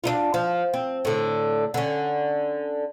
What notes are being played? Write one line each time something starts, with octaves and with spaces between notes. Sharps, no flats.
D4 D#4 F4
F3
C4
A2 D3
D3 C#4